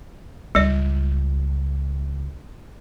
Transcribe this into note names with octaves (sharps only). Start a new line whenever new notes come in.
C#2 G3 D5